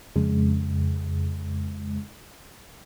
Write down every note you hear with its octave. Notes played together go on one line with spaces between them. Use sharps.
F2 C#3 G#3